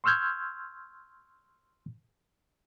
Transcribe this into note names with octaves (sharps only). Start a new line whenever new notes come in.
C6 C#6 E6 F6 G6 G#6